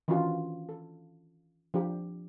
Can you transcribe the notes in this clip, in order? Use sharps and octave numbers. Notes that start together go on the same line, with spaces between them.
D#3 E3 C#4 D4 F4 F#4
A4
F3 D4 G4